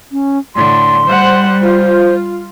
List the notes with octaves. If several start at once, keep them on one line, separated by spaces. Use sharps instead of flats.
C#4
A2 D3 C6
G3 C5 F#5
F4 C5